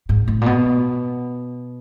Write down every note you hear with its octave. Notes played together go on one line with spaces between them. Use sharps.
G#2
A2
A#2
B2